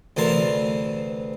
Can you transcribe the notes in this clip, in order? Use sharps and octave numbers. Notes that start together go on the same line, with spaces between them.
D2 C3 E3 A#4 A5 C6